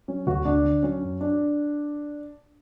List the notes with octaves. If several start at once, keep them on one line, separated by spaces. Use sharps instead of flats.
F#3 C#4
D2 F#4
D2 D4
D3
F#3 C#4
F#2
D4